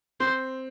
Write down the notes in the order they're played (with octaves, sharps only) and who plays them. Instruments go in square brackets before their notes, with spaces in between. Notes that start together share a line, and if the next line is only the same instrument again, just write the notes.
[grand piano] C4 [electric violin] C5